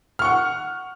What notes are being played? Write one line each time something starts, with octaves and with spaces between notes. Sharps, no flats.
F#5 C#6 F6